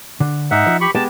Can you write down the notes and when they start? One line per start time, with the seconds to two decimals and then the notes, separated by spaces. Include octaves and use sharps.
0.20 D3
0.51 G#2 D#4 E5 F#5
0.67 F3
0.81 G4 B5 C#6
0.95 G#3 B3 G4 A5